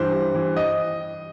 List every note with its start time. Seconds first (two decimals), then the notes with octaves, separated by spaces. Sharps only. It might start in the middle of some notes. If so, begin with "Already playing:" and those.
Already playing: G2 E3 C5
0.13 G2
0.35 E3
0.57 D#5